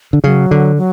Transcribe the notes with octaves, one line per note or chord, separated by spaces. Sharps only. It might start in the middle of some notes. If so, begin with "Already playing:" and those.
D3
C#3 F#3
D3
F#3